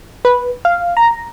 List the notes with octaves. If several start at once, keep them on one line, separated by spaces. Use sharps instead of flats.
B4
F5
A#5